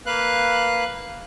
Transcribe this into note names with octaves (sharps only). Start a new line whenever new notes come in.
A#3 B4 F5 F#6